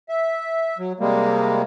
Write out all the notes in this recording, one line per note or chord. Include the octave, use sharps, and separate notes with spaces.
E5
F#3
C3 G3 G#3 A#3